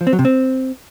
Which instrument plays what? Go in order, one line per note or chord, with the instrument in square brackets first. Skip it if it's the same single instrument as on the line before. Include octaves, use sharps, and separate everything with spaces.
[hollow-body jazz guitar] F3
C4
F#3
C3
C4